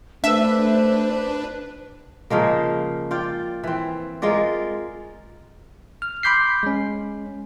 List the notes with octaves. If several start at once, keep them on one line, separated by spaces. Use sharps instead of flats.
A3 D4 B4 C5 E5
C#3 F3 G#3 A#3
F4 D5 G5
E3 C4
G#3 F4 A#4 D5
F6
B5 C6 D6 G6 B6 C7
G#3 C#4